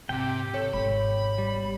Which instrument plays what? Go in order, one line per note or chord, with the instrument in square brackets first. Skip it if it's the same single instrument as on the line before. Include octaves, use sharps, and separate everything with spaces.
[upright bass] G#1 [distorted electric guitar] C3 [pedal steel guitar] G4 G5
[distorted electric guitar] A4 [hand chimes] C#5
[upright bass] G#1 B2 [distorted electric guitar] B5
[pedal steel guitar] G3